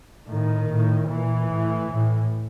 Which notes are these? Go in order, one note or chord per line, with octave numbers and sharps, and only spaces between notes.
A2 D#3
A2
A#2 E3
A2
A2